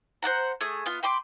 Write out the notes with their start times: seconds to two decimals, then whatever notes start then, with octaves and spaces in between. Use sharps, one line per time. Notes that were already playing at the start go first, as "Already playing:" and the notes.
0.22 C5 D5 F#5 A#5
0.61 A3 G#4 D#6
0.86 B3 F4
1.03 G5 B5 C6 D6